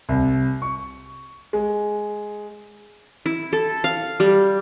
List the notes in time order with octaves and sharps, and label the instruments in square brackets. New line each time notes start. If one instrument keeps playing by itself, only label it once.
[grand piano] C2
C#6
G#3
[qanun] E4
A4
F5
G3